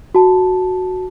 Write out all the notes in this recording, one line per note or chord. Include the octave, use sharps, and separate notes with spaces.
F#4 A5